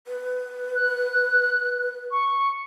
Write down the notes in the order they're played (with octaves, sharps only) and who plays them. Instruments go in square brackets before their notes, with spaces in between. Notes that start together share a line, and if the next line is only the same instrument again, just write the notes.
[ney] B4
[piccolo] F#6
C#6